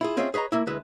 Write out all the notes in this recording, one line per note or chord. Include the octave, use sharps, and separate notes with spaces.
E4 F4 G#4
C4 C#4 F4 G#4 D#5 E5
G#4 B4 C#5 D#5 A#5
A3 A#3 E4
D2 G#3 E4 B4